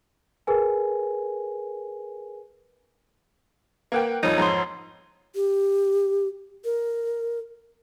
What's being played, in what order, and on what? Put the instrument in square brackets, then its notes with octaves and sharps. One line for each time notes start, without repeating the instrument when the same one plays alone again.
[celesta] G#4 A#4 B4 G#5
[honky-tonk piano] A#3 F#5 G5 [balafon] A#4 B4
[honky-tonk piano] F2 F3 [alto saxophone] D#4 [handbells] C#5
[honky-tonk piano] F2 G#2 F3 [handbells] A#5 C6
[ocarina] G4
A#4